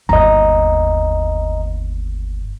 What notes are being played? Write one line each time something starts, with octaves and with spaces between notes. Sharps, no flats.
G1 D#2 D#5 A#5